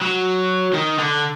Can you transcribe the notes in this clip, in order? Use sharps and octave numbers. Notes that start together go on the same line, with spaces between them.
F#3
D#3
D3